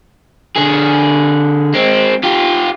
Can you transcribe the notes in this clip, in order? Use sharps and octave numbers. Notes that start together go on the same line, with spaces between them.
D3 G#4
G#3 C4
F4 G4